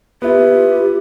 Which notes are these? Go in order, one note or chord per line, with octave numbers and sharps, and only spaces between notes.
B3 E4 F4 G4